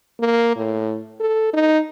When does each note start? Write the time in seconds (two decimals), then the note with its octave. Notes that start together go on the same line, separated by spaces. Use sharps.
0.20 A#3
0.56 A2
1.20 A4
1.53 D#4